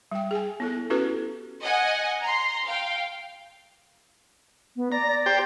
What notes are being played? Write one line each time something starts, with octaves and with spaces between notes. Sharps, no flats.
G3 G5
G#4 G#5
B3 E4 A4
C#4 E4 F#4 G4 A4 B4
D#5 F#5 G#5
A#5 C6
F5 G5
B3
D5 A#5
D5
G4 C5 G5